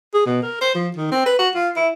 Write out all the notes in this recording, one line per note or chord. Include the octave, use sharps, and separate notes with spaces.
G#4
B2
A#4
C5
F3
D#3
C4
B4
F#4
F4
E4